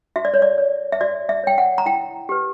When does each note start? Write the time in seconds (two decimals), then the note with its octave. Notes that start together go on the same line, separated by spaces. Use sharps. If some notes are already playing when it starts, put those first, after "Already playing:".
0.16 F#4 E5
0.25 D5
0.34 C#5
0.42 D5
0.58 C#5
0.92 E5
1.01 F#4 D5
1.29 E5
1.44 C#5 G5
1.58 F#5
1.78 A#5
1.86 E4 G5
2.29 G4 B4